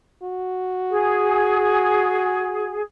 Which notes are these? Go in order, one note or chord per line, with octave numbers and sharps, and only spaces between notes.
F#4
G#4